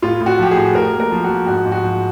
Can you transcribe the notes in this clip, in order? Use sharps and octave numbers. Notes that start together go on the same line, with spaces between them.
A2 F4
A2
F#4
F3 G4
G#4
A2
A2 A#4
A#3
A#4
F3
F#4
F3
G#2 F#4
G#2
F#4
F3